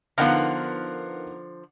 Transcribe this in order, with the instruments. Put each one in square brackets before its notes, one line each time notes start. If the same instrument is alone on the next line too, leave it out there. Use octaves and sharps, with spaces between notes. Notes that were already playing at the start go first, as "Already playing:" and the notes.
[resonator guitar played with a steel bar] D3 F3 [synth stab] B3 D#4 A#4 [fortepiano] F5 F#5